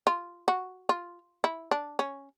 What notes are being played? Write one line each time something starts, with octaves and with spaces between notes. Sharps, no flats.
F4
F#4
F4
E4
D4
C#4